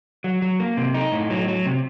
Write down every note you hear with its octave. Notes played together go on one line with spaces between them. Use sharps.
F#3
F#3
A#3
C3
D#4
A2
F#3
F#3
C3